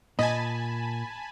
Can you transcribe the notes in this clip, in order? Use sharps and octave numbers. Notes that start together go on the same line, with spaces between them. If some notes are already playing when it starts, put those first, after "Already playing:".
A#2 D#5 G#5 A5 B5